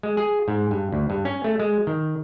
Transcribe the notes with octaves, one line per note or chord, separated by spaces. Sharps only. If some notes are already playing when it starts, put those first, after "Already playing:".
G#3
G#4
G#2
G2
D2
G2
C#4
A3
G#3
D#3